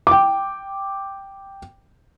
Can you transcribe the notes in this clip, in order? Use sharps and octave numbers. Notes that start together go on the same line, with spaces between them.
G5 D6